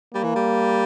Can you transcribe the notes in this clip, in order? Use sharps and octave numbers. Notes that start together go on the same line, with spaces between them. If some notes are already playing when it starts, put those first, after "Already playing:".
G3 A#3
E3
G3